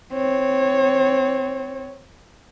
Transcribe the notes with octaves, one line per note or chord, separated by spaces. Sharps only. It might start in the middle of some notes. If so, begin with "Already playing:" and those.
C4 C#5